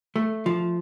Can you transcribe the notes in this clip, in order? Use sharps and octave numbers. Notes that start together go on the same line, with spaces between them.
A3
F3